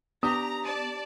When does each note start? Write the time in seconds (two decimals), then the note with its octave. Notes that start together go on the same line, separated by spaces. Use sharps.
0.23 B3 D4 G4 A#5 D#6
0.65 D5 A5 D#7